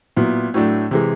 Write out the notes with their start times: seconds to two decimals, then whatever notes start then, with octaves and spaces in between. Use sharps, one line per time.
0.16 A#2 F#3 B3 E4
0.54 A2 F#3 A3 D4
0.91 C3 E3 G#3